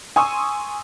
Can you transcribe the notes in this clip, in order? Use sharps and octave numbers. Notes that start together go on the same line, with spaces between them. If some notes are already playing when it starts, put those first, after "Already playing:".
G#5 C6 C#6 D#6 E6